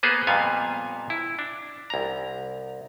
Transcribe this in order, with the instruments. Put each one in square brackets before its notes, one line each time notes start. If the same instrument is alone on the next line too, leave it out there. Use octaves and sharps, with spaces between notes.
[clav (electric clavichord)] A#3 B3 G#4 B4 C5
F2 A#2 G3 B3 F5 G#5
E4
D4
C2 A#5